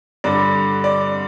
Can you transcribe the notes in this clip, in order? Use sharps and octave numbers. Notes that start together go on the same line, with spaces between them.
G2 D3 D5
D5